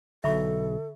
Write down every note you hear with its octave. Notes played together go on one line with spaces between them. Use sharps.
B1 D3 A4 E5 B5 C#6